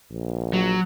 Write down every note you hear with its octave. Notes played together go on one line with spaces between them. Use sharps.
A#1
F#3